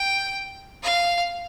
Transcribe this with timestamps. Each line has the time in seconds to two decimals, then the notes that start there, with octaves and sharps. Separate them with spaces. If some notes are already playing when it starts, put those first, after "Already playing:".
Already playing: G5
0.83 F5